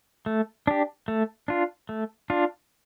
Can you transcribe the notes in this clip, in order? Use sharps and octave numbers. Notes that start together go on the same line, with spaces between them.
A3
D4 G4
A3
D4 F4
A3
D4 F4